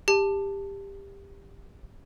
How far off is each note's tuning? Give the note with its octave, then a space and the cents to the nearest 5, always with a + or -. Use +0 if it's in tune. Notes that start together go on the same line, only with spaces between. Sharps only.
G4 +20 A5 +5